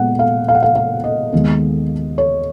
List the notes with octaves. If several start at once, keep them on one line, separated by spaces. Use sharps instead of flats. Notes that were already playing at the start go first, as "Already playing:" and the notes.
Already playing: A#2 G#3 B3 F#5
F5
F5
F#5
F5
F5
D#5
D#2 D#3 G#3 B3
C#5